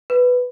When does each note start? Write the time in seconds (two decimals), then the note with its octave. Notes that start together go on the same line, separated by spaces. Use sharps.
0.10 B4